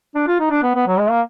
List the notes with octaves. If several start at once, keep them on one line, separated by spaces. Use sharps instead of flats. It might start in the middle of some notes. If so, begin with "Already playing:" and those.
D4
F4
D#4
D4
B3
B3
F#3
G#3
A#3